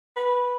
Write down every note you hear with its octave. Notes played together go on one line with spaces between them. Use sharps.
B4